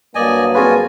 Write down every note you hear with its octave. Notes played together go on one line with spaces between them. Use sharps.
G2 F#3 A#3 D5 D#5 G#5
C4 F4 F#4 G#4 B4 G#5